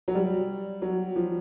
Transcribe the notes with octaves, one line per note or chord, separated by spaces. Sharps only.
F#3
G3
F#3
F3